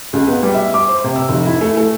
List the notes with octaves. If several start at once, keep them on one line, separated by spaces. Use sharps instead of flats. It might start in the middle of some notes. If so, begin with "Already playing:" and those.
C#2
B3
G3
E5
D6
C5
C3
E6
F1
E4
A3
A3